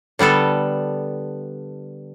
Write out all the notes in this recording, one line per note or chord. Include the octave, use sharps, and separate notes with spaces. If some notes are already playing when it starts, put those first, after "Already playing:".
D3 G3 B3 A4